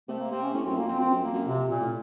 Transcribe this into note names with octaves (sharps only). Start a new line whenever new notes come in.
C3 A3
A#3
C3 C4
C#4
A2 C#4
F#2 C4
F2 A#3
F2 C4
F#2 C4
F2
F#2
F2 A#3
F#2
F2 C3
F2 A#2
A2